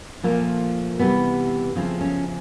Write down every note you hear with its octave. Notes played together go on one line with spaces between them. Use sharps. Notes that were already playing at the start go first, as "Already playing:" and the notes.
A#2 F3 A3 A#3
C3 E3 G3 B3
C#3 F3 A3 C4
C#4